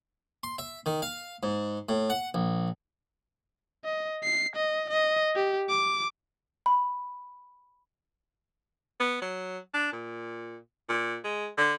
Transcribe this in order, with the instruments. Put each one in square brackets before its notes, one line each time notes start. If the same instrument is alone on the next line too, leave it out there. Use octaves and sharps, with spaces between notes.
[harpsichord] C6
E5
D#3
F5
G#2
A2
F#5
A#1
[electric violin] D#5
C7
D#5
D#5
G4
D6
[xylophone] B5
[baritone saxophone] B3
F#3
D4
A#2
A#2
G#3
D3